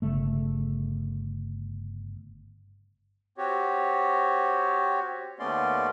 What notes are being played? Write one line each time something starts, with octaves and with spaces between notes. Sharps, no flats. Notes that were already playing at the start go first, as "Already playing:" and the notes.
G1 C#3 A3
C4 F#4 G4 C#5
D#2 A3 B3 C#4 D5 C6